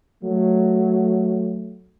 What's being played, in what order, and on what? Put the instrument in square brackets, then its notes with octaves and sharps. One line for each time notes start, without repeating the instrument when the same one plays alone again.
[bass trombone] F#3 [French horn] A3